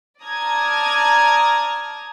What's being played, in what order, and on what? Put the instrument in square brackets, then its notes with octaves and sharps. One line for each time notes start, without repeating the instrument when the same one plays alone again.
[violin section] D5 A5 A#5 D#6 F6 G#6